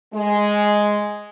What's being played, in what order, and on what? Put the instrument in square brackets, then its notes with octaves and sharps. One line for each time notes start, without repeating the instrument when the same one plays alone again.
[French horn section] G#3